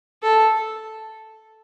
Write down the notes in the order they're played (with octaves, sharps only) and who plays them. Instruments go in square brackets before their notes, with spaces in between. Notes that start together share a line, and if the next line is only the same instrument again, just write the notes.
[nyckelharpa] A4